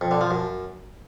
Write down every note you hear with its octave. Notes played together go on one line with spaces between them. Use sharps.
F2
D3
F3
F#2